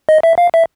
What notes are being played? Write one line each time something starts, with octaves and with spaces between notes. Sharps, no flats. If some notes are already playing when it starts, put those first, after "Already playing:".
D#5
E5
F5
E5